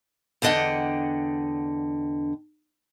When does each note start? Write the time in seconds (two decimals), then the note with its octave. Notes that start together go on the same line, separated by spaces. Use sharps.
0.42 E2 D3 D4 D#5 F#5 G5